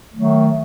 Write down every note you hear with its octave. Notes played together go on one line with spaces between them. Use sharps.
D#3 F#3 A3